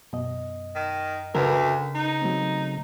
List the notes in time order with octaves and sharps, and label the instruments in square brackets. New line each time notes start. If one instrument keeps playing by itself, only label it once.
[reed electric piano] F#2 D#5 [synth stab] B2
[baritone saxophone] D#3
[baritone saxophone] D2 [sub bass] C#3 [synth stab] A#4 B4
[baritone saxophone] D#4
[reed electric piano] F#3 A3 C4